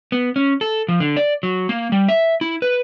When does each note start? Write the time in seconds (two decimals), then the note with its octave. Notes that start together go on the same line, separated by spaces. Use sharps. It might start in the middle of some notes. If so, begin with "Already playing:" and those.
0.12 B3
0.36 C#4
0.61 A4
0.88 F3
1.00 D3
1.17 D5
1.43 F#3
1.69 A#3
1.92 G3
2.08 E5
2.41 E4
2.62 B4